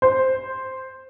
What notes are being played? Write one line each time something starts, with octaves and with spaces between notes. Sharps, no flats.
C5